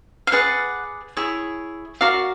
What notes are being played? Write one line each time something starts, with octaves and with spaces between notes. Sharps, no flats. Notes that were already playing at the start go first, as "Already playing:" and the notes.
F5
G#4 B4 D5 F#5
E4 G#4 C#5
F#4 A#4 D5 F5